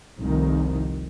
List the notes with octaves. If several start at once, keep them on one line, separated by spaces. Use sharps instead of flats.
F1 C2 D#3